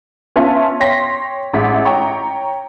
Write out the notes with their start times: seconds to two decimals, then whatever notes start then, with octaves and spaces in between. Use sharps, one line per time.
0.36 B3 C#4 F4 E5 A5
0.80 C#5 G5 C6 A#6 B6
1.53 A1 G#3 E5 B6
1.85 C#5 G5 A#5 C#6